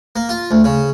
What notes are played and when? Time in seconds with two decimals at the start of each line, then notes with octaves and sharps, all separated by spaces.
0.16 A#3
0.29 F4
0.51 D2
0.64 C#3